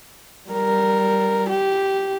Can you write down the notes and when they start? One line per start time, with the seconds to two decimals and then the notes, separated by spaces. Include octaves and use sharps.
0.50 G3 A#4
1.50 G4